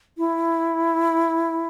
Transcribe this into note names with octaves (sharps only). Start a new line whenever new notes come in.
E4